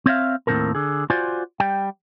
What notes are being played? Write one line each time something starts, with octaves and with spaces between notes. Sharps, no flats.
C4 C#5 E5 F5
D#2 A2 C#3 C4 A4 A#4
D3 G#4
F4 F#4 C5 D5 G#5
G3 G5